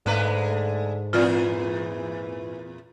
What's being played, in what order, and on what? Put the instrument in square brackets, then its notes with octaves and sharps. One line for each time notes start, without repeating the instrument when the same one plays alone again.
[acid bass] G#2 [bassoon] D3 [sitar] G#3 A3 B4
[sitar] E2 A#2 G#4 [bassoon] E3 [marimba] F4 D5